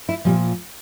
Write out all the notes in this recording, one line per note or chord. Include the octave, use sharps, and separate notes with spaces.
E4
A#2 F3 G3